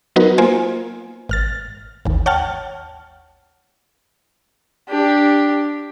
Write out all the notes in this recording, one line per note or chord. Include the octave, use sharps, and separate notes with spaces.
F#3 B3 D#4 F#4 A#4 B4
A#3 F4 C5 G#5
G#1 F6 A6
G#1 D#2
C#5 F#5 G5 A5 F6
D4 G4